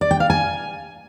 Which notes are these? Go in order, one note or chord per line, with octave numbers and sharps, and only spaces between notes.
D5
G5
F5
G#5